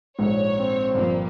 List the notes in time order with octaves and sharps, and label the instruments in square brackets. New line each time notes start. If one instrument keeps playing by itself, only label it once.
[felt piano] A#1 A4 [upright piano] G#2 [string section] C#5
[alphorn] C4
[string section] G1 F3 A#3 [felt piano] G2 A#2